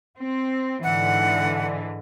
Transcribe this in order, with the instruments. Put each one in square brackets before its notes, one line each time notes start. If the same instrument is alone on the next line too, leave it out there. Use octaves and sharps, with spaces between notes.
[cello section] C4
[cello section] G#2 D3 E3 [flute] F#5